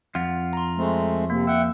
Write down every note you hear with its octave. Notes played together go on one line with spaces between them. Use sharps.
F2 F4 F#5
A#5 C6
G#3 A3 C4
C3 A#3
E5 F#5 G5 E6